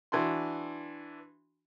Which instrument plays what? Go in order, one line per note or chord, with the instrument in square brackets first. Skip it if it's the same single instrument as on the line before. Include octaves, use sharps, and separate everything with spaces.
[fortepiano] E3 D4 F#4 C6